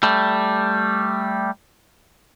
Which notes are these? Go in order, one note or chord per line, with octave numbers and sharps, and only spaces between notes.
G3 A3